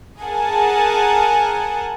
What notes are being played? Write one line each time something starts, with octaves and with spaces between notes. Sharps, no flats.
G#4 A#4 F#5 G#5 A5